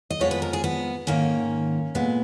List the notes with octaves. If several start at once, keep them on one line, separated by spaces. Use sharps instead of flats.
D#5
F2 F3 G#3 B3 C#5
B4
A#4
G#4
B3
G#2 D#3 A#3 C#4
A#2 G#3 B3